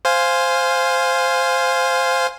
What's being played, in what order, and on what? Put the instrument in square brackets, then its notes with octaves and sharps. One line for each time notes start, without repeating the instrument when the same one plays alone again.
[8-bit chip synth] C5 F5 G#5